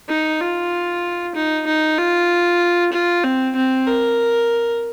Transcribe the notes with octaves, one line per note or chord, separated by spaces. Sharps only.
D#4
F4
D#4
D#4
F4
F4
C4
C4
A#4